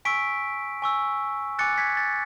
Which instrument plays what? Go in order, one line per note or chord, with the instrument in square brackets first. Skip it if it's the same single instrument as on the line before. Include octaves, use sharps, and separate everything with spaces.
[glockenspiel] G#5 C#6 E6 B6 D7
G#5 C#6 E6
G#5 D6 F#6 A6 C#7
G#6 B6
A6